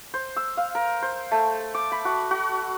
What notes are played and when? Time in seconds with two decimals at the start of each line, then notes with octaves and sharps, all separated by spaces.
0.14 C5
0.37 E6
0.57 F5
0.75 A#4
1.02 C5
1.31 A3
1.74 D6
1.92 B5
2.05 F#4
2.31 F#4